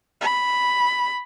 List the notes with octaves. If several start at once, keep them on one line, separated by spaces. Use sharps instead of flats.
B5